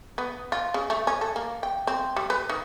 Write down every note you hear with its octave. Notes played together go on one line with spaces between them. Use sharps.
B3
F4
C#3
A3
C#4
A4
A#3
G5
C4
G3
B4
D#3